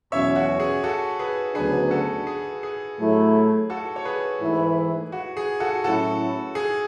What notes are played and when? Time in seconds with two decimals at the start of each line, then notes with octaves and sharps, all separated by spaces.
0.12 E2 B2 F#3 C#4 C#5 E5
0.36 F#4
0.60 G#4
0.84 F#4 A4
1.19 G#4 B4
1.55 D2 C#3 F#3 B3 D4 G#4 B4
1.91 F#4 A4
2.27 G#4
2.63 G#4
2.98 A2 F#3 A3 E4
3.70 F#4 A4
3.96 C#5
4.05 G#4 B4
4.41 G#2 E3 A3 E4
5.12 F#4
5.37 G#4
5.60 F#4 A4
5.84 A2 F#3 C#4 E4 F#4 A4
6.55 G#4